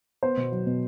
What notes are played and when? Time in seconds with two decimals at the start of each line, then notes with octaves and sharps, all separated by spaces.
0.23 B3 C5
0.37 B2
0.52 F#3
0.66 B2